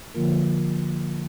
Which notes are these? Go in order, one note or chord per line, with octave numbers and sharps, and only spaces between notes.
D3 F3 A#3 F4 A#4